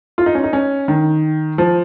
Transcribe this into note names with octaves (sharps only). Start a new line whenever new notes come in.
F4
D#4
C#4
D#4
C#4
D#3
F3